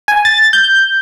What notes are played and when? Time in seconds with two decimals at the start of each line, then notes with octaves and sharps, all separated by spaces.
0.08 G#5
0.25 A6
0.53 G6